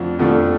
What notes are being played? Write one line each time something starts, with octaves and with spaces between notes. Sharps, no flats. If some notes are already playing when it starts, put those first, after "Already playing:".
Already playing: F2 D3 F3 A3
F2 D3 F3 A3